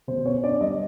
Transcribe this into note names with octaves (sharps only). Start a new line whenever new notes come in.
B2 C5
B3 C#5
D4 D5
G3 D#5